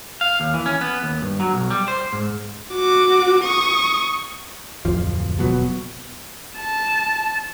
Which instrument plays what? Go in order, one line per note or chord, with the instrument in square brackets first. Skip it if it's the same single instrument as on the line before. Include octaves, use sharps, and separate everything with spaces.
[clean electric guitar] F5
D#2
E3
C#4
B3
D#2
G2
F#3
B1
G3
C5
G#2
[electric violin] F#4 D6
C#6 D#6
[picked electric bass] D1 F2 F3
E1 B2 F#3 B3
[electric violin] A5